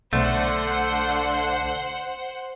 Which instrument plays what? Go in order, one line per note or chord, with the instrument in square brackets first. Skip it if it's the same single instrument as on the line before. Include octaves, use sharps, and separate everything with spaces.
[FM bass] B1 [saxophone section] D3 [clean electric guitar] A3 [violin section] C5 F#5